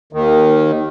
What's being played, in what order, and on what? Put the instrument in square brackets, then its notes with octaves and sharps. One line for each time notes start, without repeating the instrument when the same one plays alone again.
[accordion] D#2 D#3